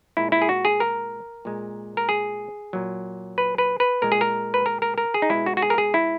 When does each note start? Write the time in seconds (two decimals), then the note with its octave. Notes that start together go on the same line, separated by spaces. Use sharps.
0.17 A#2 G#3 E4
0.32 E4
0.42 G#4
0.49 F#4
0.65 G#4
0.80 A#4
1.45 A#2 G#3
1.97 A#4
2.09 G#4
2.73 A#2 F#3
3.38 B4
3.58 B4
3.80 B4
4.02 A#2 G#3 A#4
4.12 G#4
4.21 A#4
4.54 B4
4.66 A#4
4.82 A#4
4.98 A#4
5.14 G#4
5.22 D#4
5.30 B2 G#3 E4
5.46 F#4
5.57 F#4
5.62 G#4
5.70 A#4
5.78 G#4
5.94 E4